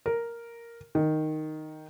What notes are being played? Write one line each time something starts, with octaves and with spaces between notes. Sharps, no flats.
A#4
D#3